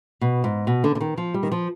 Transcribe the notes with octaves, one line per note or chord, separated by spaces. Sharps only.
B2
G#2
B2
D3
D3
D#3
F3
G3
D#3
F3